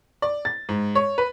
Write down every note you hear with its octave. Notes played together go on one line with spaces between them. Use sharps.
D5
A6
G#2
C#5
B4